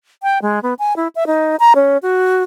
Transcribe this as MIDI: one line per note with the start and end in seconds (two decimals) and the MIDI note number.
0.23 0.39 79
0.42 0.59 56
0.63 0.74 59
0.79 0.96 80
0.96 1.08 64
1.15 1.27 76
1.27 1.56 63
1.60 1.73 82
1.75 1.98 61
2.02 2.43 66